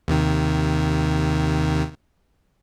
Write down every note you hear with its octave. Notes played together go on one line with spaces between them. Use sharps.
D#2 C3 D#3